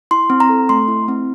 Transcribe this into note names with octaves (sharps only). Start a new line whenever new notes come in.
E4 C6
C4
A#5
A4
A3 C6
E4
C4